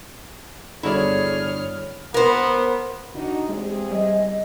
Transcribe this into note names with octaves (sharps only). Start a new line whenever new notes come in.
G1 D3 E4 F#4 G#4 C#5 D5 F6
B3 A#4 C5
G1 D4 D#4 F#4
E2 C3 G#3 G#4
G3 D#5